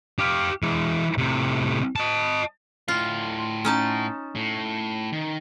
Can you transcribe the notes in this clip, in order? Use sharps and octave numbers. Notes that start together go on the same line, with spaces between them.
G4 F5
E3 G#3
A2 C3
D#5 A5
A2 F4 F5
C#4 D#4 A5
A2
D#3